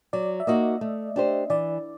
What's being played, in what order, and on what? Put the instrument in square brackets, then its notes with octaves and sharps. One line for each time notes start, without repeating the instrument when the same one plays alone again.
[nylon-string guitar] F#3 [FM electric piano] D5
[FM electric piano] E5
[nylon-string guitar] A#3 D#4 F#4 [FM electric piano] D#5
[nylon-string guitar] A3
D4 G4 C5
[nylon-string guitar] E3 [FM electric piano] D5